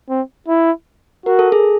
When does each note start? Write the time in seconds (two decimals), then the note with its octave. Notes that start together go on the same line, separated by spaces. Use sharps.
0.10 C4
0.48 E4
1.26 F#4 A#4
1.39 A4
1.52 G#4